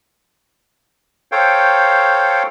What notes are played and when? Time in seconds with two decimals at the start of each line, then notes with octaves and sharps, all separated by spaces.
1.32 A4 C5 C#5 F5 G5